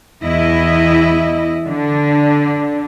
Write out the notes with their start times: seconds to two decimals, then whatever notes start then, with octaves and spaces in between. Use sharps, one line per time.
0.23 E2 E4 D#5
1.66 D3 D4